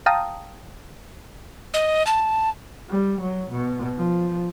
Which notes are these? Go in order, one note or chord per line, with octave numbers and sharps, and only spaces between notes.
F5 G5 A5 A#5 D#6
D#5
A5
G3
F#3
B2
F3